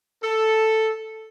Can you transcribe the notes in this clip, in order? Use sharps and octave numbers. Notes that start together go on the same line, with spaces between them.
A4